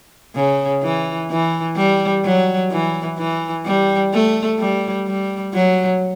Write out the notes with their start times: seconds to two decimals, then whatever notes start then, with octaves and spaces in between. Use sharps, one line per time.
0.35 C#3
0.83 E3
1.31 E3
1.77 G3
2.25 F#3
2.71 E3
3.18 E3
3.66 G3
4.13 A3
4.59 G3
5.07 G3
5.54 F#3